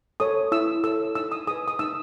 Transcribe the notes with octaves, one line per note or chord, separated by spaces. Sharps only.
A4 C#5 D#6
E4 E6
A4 C#5 E6
D#4 E6
D#6
G#4 B4 D#6
D#6
D#4 E6